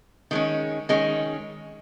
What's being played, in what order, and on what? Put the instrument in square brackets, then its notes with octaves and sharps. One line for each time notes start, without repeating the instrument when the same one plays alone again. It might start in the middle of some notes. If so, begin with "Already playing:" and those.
[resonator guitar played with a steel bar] D#3 G#3 C#4
D#3 G#3 C#4